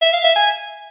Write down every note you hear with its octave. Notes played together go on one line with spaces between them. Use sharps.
E5
F5
E5
G#5